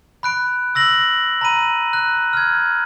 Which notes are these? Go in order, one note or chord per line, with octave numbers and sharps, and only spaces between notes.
B5 F#6 D7
E6 A#6 F#7
A#5 B5 D#7
F#6
F6 G#6